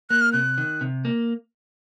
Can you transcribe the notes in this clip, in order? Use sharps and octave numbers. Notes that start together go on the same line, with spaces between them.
A#3 F#6
F6
C3 F#6
D#3
C3
A#3